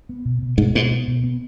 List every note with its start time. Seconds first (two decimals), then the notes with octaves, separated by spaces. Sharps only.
0.09 B3
0.25 B2
0.42 B2
0.58 G#2 B2
0.75 G#2 B2
0.91 B3
1.08 B2
1.24 B3